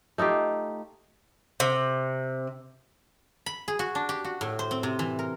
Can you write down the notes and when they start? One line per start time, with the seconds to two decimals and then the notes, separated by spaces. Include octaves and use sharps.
0.18 A3 D#4 F4 G4
1.60 C3
3.46 B5
3.68 G#4
3.79 F#4
3.95 D4
4.09 G4
4.25 F#4
4.41 A2
4.59 C5
4.71 C4
4.83 C3
4.99 E3
5.19 A#4